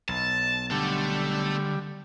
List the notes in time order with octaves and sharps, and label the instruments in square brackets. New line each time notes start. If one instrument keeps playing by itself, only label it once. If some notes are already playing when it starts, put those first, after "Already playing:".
[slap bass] B1 [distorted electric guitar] A5
[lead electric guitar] D3 [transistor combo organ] G3 [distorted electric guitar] A3 A4